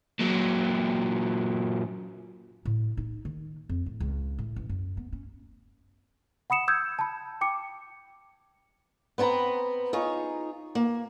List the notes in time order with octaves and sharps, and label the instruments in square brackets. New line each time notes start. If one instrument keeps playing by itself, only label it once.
[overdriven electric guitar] A#2 F#3
[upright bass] A2
D#4
D#3
F2
A2
C#2
A2
A1
F#2
B3
C#4
[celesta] F#5 B5 D#6 C#7 E7
D#6 E6 G6 G#6
A5 B5
G5 D6 C#7
[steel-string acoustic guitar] B3 C4 B4 A5 A#5
D#4 F4 G#4 C#5
A#3